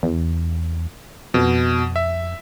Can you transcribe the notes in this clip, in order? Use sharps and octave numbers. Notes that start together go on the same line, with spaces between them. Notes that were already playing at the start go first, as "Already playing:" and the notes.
E2
F2 B2
E5